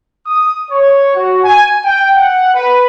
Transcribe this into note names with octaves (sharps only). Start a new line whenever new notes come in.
D#6
C#5
F#4
G#5
G5
F#5
B4